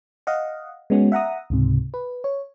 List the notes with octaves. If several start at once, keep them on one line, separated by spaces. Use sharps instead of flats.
D#5 F5 F#5
G#3 B3 C#4 F#4
E5 F#5 A#5 D#6
C#2 G#2 C3
B4
C#5